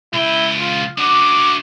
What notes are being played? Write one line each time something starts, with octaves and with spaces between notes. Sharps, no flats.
C#2 E4 G5
F4
D4 F#4 D6